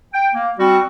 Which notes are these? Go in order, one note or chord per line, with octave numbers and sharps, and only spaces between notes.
G5
A#3
G3 C4 F#4